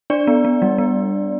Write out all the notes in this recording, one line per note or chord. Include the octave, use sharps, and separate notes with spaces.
D4 D5
B3
B3
G3
B3